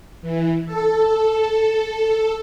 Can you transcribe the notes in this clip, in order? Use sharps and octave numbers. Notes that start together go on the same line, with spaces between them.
E3
A4